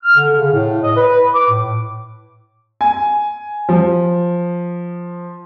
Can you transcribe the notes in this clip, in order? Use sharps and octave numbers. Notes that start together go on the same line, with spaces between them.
F6
D3
C#3
A2
D#5
B4
D6
A2
G#5
F3